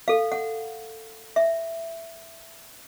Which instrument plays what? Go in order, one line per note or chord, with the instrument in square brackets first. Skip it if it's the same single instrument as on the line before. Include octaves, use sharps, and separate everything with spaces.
[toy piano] A4 F5
F#5
E5